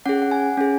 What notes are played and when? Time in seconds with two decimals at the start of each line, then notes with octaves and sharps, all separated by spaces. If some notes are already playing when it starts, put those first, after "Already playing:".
0.06 C#4 G#4 F#5
0.22 F#5
0.31 G#5
0.57 C#4 G#4